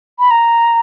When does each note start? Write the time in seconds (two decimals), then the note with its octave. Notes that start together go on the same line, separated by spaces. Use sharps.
0.19 B5
0.31 A#5